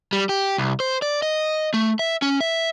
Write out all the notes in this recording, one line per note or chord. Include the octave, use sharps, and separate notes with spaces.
G3
G4
C2
C5
D5
D#5
A3
E5
C#4
E5